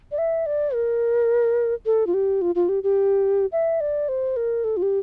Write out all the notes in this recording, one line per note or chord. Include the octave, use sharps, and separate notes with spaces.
D5
E5
D5
A#4
A4
F4
G4
F4
F4
G4
G4
E5
D5
C5
A#4
A4
F4
G4